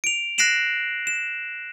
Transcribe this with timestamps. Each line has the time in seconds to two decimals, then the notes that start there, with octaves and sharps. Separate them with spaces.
0.04 D7 F7
0.38 F#6 A#6 C7 D7 E7 F#7
1.07 E7